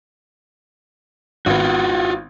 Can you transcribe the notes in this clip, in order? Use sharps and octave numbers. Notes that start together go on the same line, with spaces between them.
G#1 B3 F4 F#4